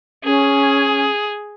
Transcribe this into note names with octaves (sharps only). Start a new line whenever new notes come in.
C#4 G#4